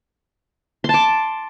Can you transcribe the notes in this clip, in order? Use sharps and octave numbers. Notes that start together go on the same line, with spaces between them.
A5 C6 D6